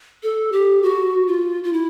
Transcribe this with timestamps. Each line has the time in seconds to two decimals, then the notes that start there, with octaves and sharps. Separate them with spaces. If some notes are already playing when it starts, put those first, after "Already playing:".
0.23 A4
0.52 G4
0.83 F#4
1.28 F4
1.64 F4
1.73 E4